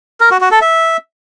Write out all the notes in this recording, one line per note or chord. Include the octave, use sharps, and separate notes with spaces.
A#4
F#4
F#4
A4
E5